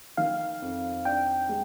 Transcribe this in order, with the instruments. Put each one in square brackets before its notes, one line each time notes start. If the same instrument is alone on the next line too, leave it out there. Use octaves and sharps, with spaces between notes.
[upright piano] D#3 [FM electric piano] F5
[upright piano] F2
[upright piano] D4 [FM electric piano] G5
[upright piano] G#3